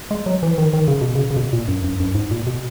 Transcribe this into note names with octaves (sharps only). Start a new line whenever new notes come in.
G#3
F#3
E3
D#3
D#3
C#3
B2
C#3
C#3
B2
A#2
F#2
F#2
F#2
G#2
A#2
B2